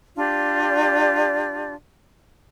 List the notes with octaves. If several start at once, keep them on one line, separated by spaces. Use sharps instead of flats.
D4 F4 G4 D5